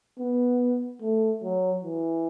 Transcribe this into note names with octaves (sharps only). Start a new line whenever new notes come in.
B3
A3
F#3
E3